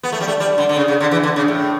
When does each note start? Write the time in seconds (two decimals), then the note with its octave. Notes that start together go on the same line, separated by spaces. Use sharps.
0.03 B3
0.12 A3
0.21 G3
0.28 A3
0.40 G3
0.58 D3
0.69 D3
0.77 C#3
0.88 C#3
1.00 D3
1.11 E3
1.23 D3
1.36 C#3
1.48 A2